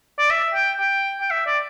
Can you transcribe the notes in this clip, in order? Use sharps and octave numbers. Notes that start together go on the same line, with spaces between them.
D5
E5
G5
G5
G5
E5
D5